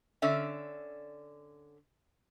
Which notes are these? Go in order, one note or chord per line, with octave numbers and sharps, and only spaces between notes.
D3 C#4 D5 E5